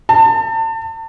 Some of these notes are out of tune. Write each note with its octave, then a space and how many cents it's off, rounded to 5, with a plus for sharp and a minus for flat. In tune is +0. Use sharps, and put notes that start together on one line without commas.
A5 +35